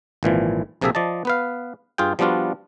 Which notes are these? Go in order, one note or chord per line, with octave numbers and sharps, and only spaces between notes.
G#1 A#2 E3 F3
A#1 C3 A#3 G#4 A4 E5
F3 D5 D#5 A5
B3 B4 F5
G2 F4 G#4 G5
F3 G3 B3 D4 F4 F#4